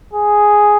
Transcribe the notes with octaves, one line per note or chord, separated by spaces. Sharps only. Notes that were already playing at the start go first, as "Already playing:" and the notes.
G#4